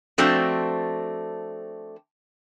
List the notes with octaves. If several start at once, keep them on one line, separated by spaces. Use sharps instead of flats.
F3 A3 C4 D4 F#4 C5